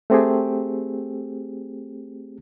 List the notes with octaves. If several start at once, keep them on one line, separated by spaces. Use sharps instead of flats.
A3 C4 G4 G#4